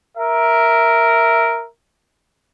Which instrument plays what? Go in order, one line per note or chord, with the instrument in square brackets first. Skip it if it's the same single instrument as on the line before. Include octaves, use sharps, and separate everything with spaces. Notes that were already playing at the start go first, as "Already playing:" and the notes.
[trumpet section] A#4 E5